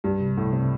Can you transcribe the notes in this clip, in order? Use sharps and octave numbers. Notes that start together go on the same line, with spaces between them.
C2 G2
C3
C2 A2
C3